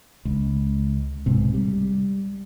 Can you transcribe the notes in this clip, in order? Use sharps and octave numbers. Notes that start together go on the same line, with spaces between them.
C#2
B1 G#2 C3
G3